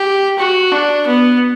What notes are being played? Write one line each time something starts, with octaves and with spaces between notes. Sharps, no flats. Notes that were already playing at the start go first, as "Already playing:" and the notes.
Already playing: G4
F#4
D4
B3